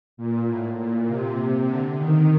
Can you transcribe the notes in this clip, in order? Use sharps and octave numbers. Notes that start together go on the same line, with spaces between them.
A#2
A2
A#2
C3
D3
D#3